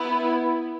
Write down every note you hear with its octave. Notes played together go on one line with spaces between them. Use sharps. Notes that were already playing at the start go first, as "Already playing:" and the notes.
Already playing: B3 E4